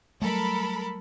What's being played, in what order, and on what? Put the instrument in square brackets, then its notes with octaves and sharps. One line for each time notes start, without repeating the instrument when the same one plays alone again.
[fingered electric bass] F#3 G3 A3 [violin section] A4 A#4 B5